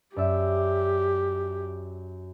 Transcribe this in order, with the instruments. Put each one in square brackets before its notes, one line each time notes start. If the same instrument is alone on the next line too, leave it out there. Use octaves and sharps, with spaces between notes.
[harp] F#2 D5 E5 [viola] G4